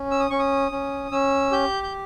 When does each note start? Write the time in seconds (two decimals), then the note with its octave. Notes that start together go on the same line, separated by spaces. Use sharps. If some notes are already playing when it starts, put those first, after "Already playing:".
Already playing: C#4
0.11 E6
0.20 D#6
0.30 C#4 C#6
0.39 D#6
0.72 C#4
1.12 C#4 E6
1.52 G4 G6
1.83 G6